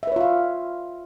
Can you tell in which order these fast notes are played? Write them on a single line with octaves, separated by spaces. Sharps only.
E5 B4 C#5 F4 F5